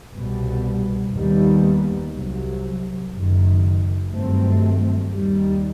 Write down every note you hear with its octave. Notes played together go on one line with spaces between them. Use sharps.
C2 B2 G3 B3
D#2 D#3 G3 B3
C2 C3 F#3
F#1 F#2 D#3
G2 D#3 F#3 A3 C4
D#2 D#3 G3